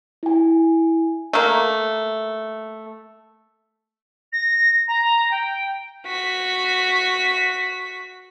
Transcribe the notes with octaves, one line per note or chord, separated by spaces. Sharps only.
E4 G#5
A3 A#3
A#6
A#5
G5
F#4 B6